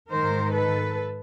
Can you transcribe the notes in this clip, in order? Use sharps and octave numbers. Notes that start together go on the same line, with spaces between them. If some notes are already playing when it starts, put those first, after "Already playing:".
G#2 D#3 A#4 C5
A4 B4